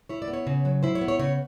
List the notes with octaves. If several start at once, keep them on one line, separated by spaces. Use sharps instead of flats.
E4 C#5
D5
B3
C#5
C#3
F#3
E4 C5
C#5
B3
C#5
C#3 C#5